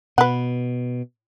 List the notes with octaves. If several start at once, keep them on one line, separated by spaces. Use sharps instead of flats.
B2 B4 F#5